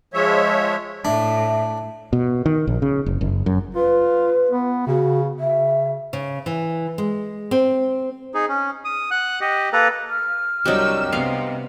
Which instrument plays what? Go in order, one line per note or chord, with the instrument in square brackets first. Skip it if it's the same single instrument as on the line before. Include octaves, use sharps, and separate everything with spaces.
[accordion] F3 G#3 C#5 E5
[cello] A2 [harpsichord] D4 [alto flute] E5
[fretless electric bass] B2
D#3
A#1
C#3
F#1
F#1
F#2
[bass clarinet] F4 [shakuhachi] B4
[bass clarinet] B3
[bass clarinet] C#3 [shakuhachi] F#4
[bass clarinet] C#3 [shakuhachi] E5
[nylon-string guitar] C#3
E3
G#3
C4
[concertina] D#4 G#4
C#4
D#6
F#5 F#6
G4 D#5
A#3 A4 B4 A#5
[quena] F6
[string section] C2 E6 [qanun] F#3 D4 G4 [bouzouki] C4 D#4
[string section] C3 [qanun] B3 F5